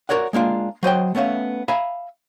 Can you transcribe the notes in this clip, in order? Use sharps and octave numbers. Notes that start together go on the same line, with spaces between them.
F#4 G#4 A#4 C#5 D5 F#5
G#3 A#3 D4 F4
F#3 C5 D#5 G5
A3 B3 C#4 E5 F5
E5 F5 G#5 A#5 B5